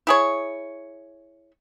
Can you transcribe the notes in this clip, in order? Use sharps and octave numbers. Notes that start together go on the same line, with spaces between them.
E4 G#4 C#5